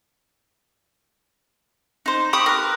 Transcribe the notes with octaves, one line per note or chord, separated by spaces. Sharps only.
D#4 C5
G4 B5 C#6 D#6
A#4 B4